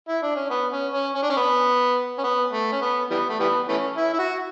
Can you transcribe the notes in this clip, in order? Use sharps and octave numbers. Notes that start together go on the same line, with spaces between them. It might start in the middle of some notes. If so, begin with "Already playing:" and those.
E4
D4
C#4
B3
C#4
C#4
C#4
D4
C#4
B3
C#4
B3
A3
C#4
B3
E3 G3 B3
A3
E3 G3 B3
E3 A3 C#4
E4
E4
F#4